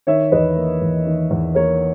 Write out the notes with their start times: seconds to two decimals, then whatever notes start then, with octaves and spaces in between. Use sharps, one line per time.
0.07 D#3 C#5 E5
0.32 E2 B4 D#5
0.56 A#3
0.82 E2
1.06 D#3
1.31 E2
1.55 A#3 A#4 C#5